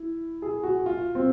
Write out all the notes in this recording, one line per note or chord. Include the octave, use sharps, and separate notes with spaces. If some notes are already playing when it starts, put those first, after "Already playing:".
Already playing: E4
G#4
F#4
F4
C4